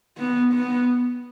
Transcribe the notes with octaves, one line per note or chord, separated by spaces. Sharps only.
B3
B3